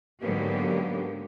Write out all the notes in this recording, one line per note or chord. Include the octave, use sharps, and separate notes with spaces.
G#2 D3 F#3 A#3 B3 G4